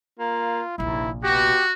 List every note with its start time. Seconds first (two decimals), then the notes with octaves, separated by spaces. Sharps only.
0.20 A#3 F4
0.78 F1 A#1 D#2 E4
1.23 B2 F#4 G4